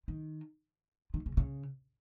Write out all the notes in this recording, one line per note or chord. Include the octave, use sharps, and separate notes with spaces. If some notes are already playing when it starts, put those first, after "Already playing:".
D#3
D#3
C#3
C#3